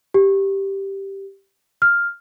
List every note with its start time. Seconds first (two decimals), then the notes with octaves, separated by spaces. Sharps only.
0.14 G4
1.82 F6